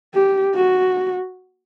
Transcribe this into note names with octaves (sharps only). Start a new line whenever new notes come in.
G4
F#4